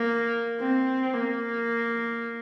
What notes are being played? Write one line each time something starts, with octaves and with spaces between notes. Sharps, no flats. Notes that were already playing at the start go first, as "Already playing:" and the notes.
Already playing: A#3
C4
A#3